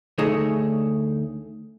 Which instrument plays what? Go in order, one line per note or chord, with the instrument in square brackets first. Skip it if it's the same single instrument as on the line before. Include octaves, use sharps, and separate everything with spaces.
[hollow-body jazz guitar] D2 A3 D#4 G#4 C#5